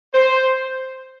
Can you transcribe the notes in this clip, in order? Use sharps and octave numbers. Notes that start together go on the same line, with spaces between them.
C5